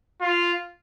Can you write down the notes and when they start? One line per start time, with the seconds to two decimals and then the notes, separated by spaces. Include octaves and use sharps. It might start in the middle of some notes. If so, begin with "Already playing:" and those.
0.21 F4